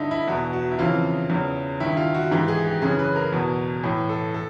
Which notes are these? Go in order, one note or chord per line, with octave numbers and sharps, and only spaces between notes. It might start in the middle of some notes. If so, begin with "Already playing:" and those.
Already playing: G2 D3 D#4 E4
E4
E2 B2 F#4
F#4
E4
F2 C#3 E3 F4
E2 C#3 E3
G2 D#3 E4
F4
F#4
G#2 E3 G4
G#4
G4
F#2 C#3 E3 G#4
B4
A#4
E2 B2
A2 E3
A4
A4